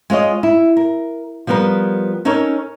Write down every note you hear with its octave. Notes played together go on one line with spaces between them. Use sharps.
G#3 F4 C#5 D#5
E4
A#4
F3 G3 B3 A#4 B4
C#4 D#4 A4 A#4 C#5